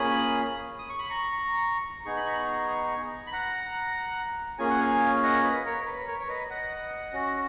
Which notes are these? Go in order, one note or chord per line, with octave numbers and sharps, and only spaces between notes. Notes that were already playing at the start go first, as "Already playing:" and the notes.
Already playing: A#3 C#4 F4 G#4 B5 D#6
D#6
C#6
B5
A#5 C#6
B3 D#4 G#4 C#6
B5
A#5 C#6
B5
F#5 A#5
A#3 C#4 F4 G#4 G#5
F#5
F5 G#5
D#5 F#5
B4 D#5
A#4 C#5
B4
A#4 C#5
C#5
B4 D#5
D#5 F#5
C#4 F#4